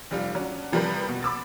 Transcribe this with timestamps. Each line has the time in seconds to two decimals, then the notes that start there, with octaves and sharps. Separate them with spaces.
0.11 F1 G3 F4
0.35 F#3 C#4 D4
0.72 C3 F3 G3 A#4 B4
1.09 B2
1.23 B5 D6 E6 A6